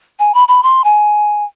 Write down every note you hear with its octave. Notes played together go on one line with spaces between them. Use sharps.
G#5
B5
B5
C6
G#5